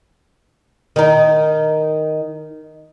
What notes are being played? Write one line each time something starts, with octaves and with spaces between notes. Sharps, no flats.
D#3 D#4